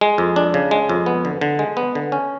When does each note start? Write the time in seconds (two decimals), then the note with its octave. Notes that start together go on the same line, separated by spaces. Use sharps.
0.01 G#3
0.18 F2
0.36 D4
0.54 C#3
0.71 G#3
0.89 F2
1.06 B3
1.25 D3
1.41 D3
1.59 G#3
1.77 B3
1.95 D3
2.12 C#4